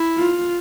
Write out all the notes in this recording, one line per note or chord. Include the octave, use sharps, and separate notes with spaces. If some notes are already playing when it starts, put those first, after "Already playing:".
Already playing: E4
F4